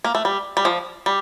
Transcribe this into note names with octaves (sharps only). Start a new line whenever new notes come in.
A#3
A3
G3
G3
F3
G3